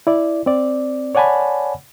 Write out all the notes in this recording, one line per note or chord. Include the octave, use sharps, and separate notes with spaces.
E4 D5
C4 D5
C#5 D5 F#5 G#5 A5 B5